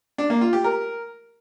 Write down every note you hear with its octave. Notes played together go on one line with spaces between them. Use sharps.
D4
A#3
F4
G4
A#4